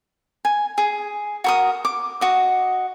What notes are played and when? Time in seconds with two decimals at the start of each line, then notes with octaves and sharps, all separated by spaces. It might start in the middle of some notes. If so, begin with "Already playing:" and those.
0.45 G#5
0.78 G#4
1.44 F#4 A#4 D#6
1.85 D6
2.21 F#4 D#5